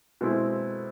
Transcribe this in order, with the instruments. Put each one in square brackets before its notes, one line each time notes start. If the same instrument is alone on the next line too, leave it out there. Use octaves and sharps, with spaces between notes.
[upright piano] B2 G#3 C4 E4